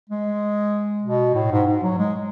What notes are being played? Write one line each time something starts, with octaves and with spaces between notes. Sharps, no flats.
G#3
B2
A2
G#2
G#2
F#3
G#3